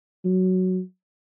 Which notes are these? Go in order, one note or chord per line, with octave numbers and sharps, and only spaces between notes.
F#3